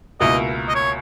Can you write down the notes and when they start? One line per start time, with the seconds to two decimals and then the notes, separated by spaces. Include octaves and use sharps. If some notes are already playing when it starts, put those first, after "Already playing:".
0.20 C#2 B2 A#3 E4 A#4 D#5
0.69 D#5
0.75 C#5